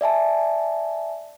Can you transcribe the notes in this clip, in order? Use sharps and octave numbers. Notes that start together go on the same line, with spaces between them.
D5 E5 G#5 A5